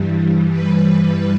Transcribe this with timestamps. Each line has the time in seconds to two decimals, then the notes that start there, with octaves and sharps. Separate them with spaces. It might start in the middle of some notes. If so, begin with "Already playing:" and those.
Already playing: G2 E3 G3
0.50 B4